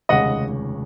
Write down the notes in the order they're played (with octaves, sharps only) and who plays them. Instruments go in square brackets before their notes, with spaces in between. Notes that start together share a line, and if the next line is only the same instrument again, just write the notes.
[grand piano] F1 D#2 C#3 G#3 D#5 F#5